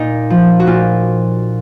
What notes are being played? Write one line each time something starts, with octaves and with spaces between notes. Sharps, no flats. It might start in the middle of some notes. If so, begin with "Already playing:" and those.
Already playing: A#2 D#4
F3
F#4
A#2 F4